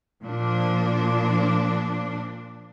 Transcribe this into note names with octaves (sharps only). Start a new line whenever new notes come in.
A#2 F3 D4